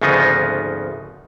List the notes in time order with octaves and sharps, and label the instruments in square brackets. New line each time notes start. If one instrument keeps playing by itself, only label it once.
[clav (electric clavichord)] G#1 D2 C#3 F3 B3 D#4